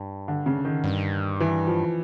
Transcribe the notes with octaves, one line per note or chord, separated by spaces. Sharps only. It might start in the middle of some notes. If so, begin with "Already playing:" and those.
Already playing: G2
D3
C#3
D#3
G2
E3
F3